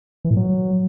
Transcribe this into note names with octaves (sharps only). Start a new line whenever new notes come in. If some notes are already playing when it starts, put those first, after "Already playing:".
E3
A2
F#3